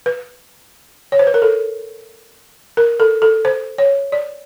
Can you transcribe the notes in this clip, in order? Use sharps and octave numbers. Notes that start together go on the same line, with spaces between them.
B4
C#5
C5
B4
A#4
A4
A#4
A4
A4
C5
C#5
D5